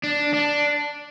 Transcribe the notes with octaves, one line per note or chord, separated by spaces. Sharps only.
D4
D4